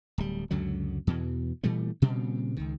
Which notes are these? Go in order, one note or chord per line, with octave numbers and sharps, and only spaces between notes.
D1 G3
C#2 F#2 D3 F#3
E2 B2 E3
A#2 E3 G3 A3
A#2 C#3 G3 C4
C#2 D#3